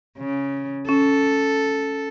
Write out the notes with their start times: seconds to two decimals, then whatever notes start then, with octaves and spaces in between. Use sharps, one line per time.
0.18 C#3
0.89 C#4 A4